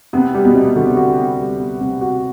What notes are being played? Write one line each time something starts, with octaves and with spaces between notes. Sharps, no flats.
C3 B3
G3
B2
C3
D3 F#4
F#4
B3
G3
B3
C3
F#4